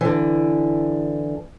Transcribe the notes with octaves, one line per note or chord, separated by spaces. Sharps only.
D3 E3